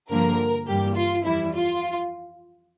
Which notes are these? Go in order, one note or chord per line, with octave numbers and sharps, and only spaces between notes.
G2 D3 F3 A#3 A#4
G2 E3 G3 A#3 G4
F4
F2 E3 G3 E4
F4